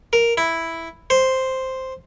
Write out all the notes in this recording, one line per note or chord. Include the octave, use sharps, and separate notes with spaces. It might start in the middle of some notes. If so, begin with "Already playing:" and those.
A#4
E4
C5